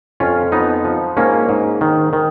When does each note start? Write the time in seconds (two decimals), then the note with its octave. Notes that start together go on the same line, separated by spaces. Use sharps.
0.20 F2 C#4 F4
0.52 F3 B3 D#4
0.85 F3
1.17 G#2 A#3 C#4
1.49 G#2
1.81 D#3
2.13 D#3